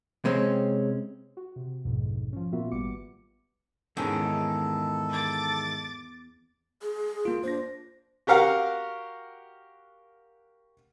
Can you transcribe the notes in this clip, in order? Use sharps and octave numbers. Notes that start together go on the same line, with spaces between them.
C3 G#3 C4 C#4
F#4
C3
A#1 F2 G#2 B2
F3 C#4
A#2 A#3 B3 F4 F#4 E5
G#1 G3 B3 D6 C#7
E2 G#2 D#3 E3 C#4 A4
D6 A6
G#4
A#3 F4
D4 C5 A#6
F#4 G4 A#4 F5 F#5